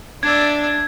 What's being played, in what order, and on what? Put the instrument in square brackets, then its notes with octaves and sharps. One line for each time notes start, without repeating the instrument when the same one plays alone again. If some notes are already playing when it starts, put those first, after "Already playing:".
[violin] D4 [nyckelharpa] D5 E5 [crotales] G#6